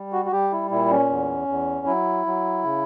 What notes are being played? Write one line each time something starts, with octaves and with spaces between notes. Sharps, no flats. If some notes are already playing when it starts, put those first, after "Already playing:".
Already playing: G3
F#4
F#4
G3 G4
E4
A#2 E4
C#4
E2
E2
F#3 E4
F#3
C#3